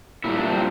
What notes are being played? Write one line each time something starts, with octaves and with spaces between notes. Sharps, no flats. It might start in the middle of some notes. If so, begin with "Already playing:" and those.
A#2 G3 E4
D4
C4